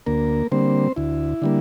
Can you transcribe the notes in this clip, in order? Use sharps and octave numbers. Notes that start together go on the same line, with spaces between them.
D2 A#3 A#4
D3 G3 A#3 C4 C5
D2 E4
D3 G3 A#3